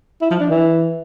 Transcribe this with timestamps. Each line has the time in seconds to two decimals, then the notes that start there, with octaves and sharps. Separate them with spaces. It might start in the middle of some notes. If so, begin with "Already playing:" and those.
0.21 E4
0.31 F3
0.40 D4
0.50 E3